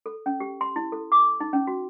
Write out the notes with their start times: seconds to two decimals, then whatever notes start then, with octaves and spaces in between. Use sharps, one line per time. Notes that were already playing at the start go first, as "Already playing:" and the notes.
0.06 A4
0.26 C#4
0.40 G4
0.61 C6
0.76 E4
0.92 A4
1.12 D6
1.40 D#4
1.53 C#4
1.67 F#4